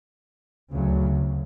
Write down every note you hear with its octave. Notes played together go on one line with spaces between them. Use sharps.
D2 C#3 F#3